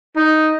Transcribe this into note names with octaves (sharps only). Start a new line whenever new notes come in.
D#4